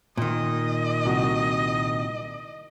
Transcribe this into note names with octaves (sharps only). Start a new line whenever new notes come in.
A#2 D#3 D#5
C2 F#4